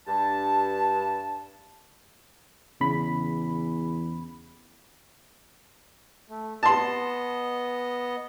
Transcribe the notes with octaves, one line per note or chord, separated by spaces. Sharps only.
G2 A5
E2 C#3 B5
A3
B3 D#5 A5 C6